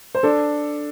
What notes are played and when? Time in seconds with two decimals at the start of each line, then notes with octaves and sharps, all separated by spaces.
0.15 C5
0.23 D4 A4